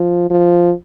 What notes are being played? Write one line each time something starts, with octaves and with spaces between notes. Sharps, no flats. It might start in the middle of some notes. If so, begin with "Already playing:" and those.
Already playing: F3
F3